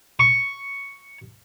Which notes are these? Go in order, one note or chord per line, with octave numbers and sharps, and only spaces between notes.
C#6